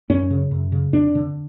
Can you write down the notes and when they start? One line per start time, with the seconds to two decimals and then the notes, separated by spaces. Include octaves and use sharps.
0.10 F#2 C#4
0.30 C#3
0.51 F#2
0.72 C#3
0.93 F2 D4
1.15 D3